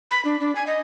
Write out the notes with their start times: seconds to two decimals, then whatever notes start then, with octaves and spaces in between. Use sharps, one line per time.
0.11 B5
0.25 D4
0.40 D4
0.55 G#5
0.67 D#5